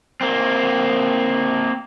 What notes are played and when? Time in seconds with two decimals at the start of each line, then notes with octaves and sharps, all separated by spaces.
0.21 A#3 C4